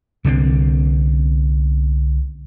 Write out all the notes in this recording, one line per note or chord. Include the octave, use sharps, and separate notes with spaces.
C2 D3 F#3 C4